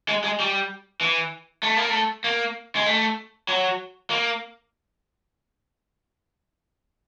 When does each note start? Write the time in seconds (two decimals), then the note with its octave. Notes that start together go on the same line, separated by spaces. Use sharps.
0.09 G#3
0.24 G#3
0.40 G3
1.01 E3
1.63 A3
1.76 A#3
1.89 A3
2.24 A#3
2.76 G#3
2.86 A3
3.48 F#3
4.10 A#3